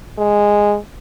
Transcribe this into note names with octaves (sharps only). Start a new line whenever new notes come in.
G#3